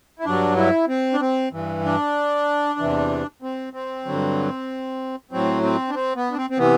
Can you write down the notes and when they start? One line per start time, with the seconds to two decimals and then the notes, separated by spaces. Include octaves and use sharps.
0.19 E4
0.25 G2 F#3 D4
0.57 E4
0.88 C4
1.14 D4
1.20 C4
1.52 G2 E3
1.84 D4
2.79 E2 C3 E3
3.42 C4
3.73 C4
4.05 G2 D3 F#3
5.31 A2 F#3 C4
5.63 C4
5.90 D4
5.94 C4
6.16 B3
6.31 D4
6.37 C4
6.50 C4
6.58 C3 E3 B3